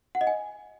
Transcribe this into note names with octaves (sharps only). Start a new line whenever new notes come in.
F#5
D#5
G#5